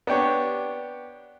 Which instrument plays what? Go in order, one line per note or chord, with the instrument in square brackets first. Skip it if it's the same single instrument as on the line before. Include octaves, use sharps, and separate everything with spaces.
[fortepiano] B3 D4 G4 C#5